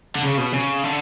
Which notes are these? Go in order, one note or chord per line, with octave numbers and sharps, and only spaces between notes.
D3
C#3
B2
C#3
D3